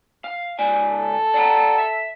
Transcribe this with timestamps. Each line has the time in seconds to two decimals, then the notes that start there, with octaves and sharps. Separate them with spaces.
0.24 F5
0.59 C#2 D5 G#5
0.90 A4
1.34 D5 F#5 A#5
1.78 E5